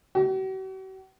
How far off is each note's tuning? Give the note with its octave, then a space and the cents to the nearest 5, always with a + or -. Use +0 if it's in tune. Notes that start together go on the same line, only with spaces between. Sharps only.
F#4 +45